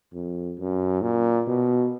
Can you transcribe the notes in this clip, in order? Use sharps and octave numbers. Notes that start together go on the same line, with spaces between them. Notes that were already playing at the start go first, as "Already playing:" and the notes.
F2
F#2
A#2
B2